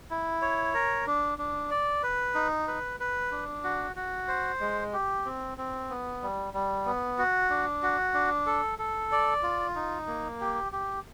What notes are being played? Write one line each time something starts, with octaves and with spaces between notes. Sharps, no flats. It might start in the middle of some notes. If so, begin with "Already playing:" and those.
E4
C#5
A#4
D4
D4
D5
B4
D#4
B4
B4
D4
F#4
F#4
C5
G#3
G4
C4
C4
B3
G3
G3
B3
F#4
D4
F#4
D4
A4
A4
D5
F4
D#4
A#3
G4
G4